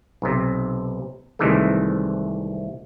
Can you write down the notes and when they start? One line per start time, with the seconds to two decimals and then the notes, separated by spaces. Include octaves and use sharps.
0.22 B1 C3
1.39 C2 C3 D#3 E3 G#3 A3